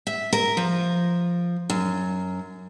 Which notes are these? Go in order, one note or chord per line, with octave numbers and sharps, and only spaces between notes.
E5
A#4
F3
F#2